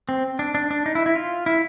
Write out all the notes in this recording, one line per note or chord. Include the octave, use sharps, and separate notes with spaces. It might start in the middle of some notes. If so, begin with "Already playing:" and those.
C4
D4
D4
D4
D#4
E4
E4
F4
E4